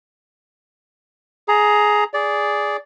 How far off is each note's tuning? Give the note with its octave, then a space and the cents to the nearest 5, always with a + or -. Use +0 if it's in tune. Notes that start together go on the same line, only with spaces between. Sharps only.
G#4 +15 A#5 +0
G#4 +0 D5 -10